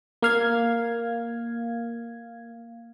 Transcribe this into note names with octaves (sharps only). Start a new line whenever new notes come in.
A#3 F5 G#6